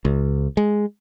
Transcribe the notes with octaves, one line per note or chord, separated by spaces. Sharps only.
C#2
G#3